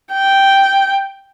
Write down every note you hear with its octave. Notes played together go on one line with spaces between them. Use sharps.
G5